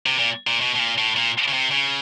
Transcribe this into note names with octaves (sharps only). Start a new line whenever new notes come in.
C3
A#2
A#2
B2
B2
A#2
A2
A#2
C#3
C3
C#3